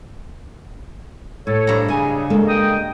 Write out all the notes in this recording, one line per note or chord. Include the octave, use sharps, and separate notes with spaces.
A2 A4 C#5
G2 A#5
C#3 D#5 G#5
G#3 A#3 A4
D#5 G5 D#6